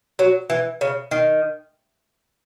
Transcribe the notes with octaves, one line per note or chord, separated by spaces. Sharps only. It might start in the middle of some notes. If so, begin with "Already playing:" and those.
F#3
E3
C#3
D#3